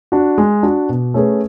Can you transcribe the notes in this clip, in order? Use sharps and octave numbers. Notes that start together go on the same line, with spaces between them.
D4 F#4
G#3
D4 F#4
B2
A3 C#4 G#4 B4